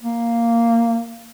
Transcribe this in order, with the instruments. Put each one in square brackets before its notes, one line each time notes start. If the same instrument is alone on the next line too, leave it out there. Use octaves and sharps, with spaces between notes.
[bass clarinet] A#3